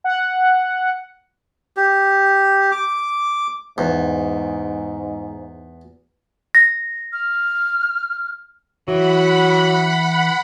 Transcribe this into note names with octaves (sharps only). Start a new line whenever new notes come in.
F#5
G4
D6
E2 G#2
A#6
F6
E3 F#3 F#5 B5